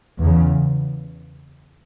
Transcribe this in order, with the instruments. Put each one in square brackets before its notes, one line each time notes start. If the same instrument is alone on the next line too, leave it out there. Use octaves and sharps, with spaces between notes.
[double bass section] E2 C#3